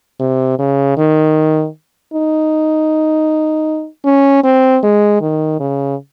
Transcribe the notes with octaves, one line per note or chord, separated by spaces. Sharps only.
C3
C#3
D#3
D#4
C#4
C4
G#3
D#3
C#3